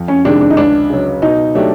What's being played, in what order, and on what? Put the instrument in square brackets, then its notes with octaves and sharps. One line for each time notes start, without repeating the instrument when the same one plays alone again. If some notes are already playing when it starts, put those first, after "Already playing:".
Already playing: [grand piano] F2
[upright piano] C#4
[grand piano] C3 D#3 G#3 [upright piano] D4
[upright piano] D4
D#4
[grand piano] C#2 [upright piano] D4
[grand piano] C#3 F#3
[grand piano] B2 [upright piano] D#4
[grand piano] F#3 A3 D4 G4